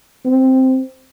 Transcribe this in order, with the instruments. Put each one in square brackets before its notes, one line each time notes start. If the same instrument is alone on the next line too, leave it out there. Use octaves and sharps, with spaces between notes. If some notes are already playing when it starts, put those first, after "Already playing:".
[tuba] C4